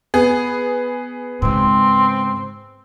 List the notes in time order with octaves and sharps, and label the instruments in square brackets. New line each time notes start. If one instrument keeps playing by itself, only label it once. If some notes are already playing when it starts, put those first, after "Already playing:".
[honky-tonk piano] B3 G#4
[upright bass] G#2 C#3 [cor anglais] C4